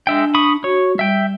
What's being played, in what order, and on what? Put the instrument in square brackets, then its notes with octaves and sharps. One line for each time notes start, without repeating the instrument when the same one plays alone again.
[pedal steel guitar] G#3 E5 G5 [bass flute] D4
[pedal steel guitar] B5 C#6 D#6
[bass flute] F#4 [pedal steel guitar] C#5
[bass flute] G3 [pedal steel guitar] E5 G5